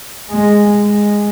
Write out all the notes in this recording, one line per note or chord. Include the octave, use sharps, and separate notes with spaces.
G#3
G#3